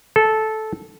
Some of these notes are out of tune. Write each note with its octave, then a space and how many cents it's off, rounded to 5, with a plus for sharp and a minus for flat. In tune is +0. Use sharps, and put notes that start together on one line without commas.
A4 -10